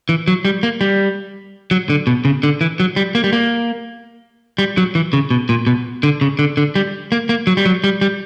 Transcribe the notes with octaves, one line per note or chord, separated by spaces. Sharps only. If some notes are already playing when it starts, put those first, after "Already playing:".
E3
F#3
G3
A#3
G3
F#3
D3
B2
C#3
D3
E3
F#3
G3
A#3
G3
A#3
G3
F#3
E3
C#3
B2
A#2
B2
D3
C#3
D3
D3
G3
A#3
A#3
F#3
G3
F#3
G3
G3